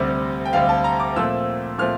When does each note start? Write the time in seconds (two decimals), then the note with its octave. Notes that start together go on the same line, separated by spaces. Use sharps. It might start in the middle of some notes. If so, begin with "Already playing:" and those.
Already playing: D2 C3 G3
0.45 G5
0.53 D2 C3 G3 F5
0.69 A5
0.84 A#5
1.00 D6
1.16 A#2 F3 A3 C4 E6
1.78 A#2 F3 A3 C4 F6